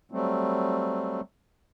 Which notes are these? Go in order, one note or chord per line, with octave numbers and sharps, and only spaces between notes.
F#3 G3 A3 C4